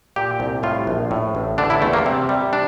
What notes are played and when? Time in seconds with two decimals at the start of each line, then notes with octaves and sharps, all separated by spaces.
0.16 A#2 G4
0.40 C2
0.63 A2 F4
0.87 A#1
1.11 A2
1.35 A1
1.58 D3 D4
1.70 E4
1.82 E2 A3
1.93 A#3
2.06 C3
2.29 G3
2.53 D4